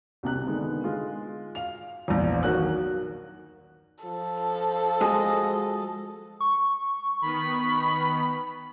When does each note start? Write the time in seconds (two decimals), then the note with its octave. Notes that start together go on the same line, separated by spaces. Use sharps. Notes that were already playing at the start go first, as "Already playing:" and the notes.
0.23 C2 C3 F#6
0.47 D3 D#3 G#3 B3
0.84 G#3 F4
1.55 F5 F7
2.08 A#1 E2
2.43 D#2 D#3 F#3 F#4 A#4 F#6
4.04 F3 A4
5.01 G#3 F#4 G#4 D#5
6.40 C#6
7.21 D#3 B3 B5